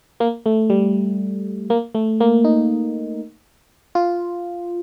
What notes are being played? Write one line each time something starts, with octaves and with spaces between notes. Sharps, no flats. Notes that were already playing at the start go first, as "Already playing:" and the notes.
A#3
A3
G3
A#3
A3
A#3
D#4
F4